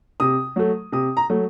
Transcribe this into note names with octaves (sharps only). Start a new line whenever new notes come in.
C3 D#6
F#3 A3
C3 D#6
A#5
F#3 A3